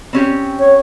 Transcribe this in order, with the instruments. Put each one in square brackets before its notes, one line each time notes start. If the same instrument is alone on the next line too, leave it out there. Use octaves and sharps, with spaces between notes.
[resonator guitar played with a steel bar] C4 C#4 G4
[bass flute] C#5